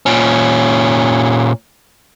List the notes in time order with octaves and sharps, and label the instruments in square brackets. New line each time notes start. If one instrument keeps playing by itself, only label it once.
[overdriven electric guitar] A#2 C#4